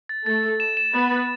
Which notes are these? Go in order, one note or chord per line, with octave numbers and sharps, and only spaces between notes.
A6
A3 A4 A6
A6
E7
E7
B3 B4 A6
A6